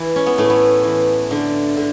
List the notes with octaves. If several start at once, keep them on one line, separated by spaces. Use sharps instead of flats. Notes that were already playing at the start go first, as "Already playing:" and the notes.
Already playing: E3 E4
C#4
B3
A2 A3
B3
E3
D3
D3